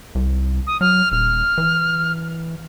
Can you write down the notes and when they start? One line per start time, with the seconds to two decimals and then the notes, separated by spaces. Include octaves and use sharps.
0.15 C2
0.67 D#6
0.81 F#3 F6
1.12 D#1 F6
1.58 E3